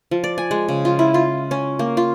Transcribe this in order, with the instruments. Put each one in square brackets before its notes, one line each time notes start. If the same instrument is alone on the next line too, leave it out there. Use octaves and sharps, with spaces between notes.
[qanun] F3
D5
G#5
G#3
C#3
F4
E4
F4
C#4
A#3
F4